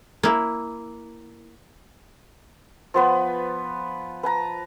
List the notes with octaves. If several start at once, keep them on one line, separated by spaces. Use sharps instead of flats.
A#3 E4
F3 B3 B4
B4 A5 A#5